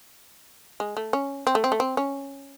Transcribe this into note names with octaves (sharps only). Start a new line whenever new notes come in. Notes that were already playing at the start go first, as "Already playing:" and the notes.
G#3
A3
C#4
C4
A3
C4
A3
C4
C#4